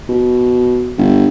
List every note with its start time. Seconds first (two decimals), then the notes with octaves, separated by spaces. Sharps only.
0.09 B2
0.98 G1